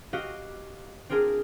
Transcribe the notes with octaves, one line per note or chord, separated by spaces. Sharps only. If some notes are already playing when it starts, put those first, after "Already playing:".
F#4 G4 D#5 F5
C4 D4 F4 G#4 A#4